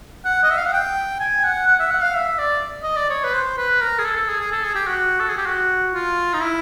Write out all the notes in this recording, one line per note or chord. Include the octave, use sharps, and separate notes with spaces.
F#5
D#5
E5
F5
F#5
G5
G#5
F#5
F#5
E5
F#5
F5
E5
D5
D#5
D5
C#5
B4
C5
B4
A#4
G#4
A4
A4
G#4
G#4
A4
G#4
G4
F#4
A4
G#4
G4
F#4
F4
D#4
E4